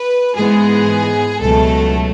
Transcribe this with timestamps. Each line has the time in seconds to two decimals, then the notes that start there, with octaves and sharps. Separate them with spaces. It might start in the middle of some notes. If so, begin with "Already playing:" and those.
Already playing: B4
0.36 G#2 E3 G#3 B3 G#4
1.39 C#2 B2 F#3 A3 A4